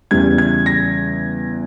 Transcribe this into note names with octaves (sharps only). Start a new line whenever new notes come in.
E2 C#3 E3 G3 G#6
G#6
A#6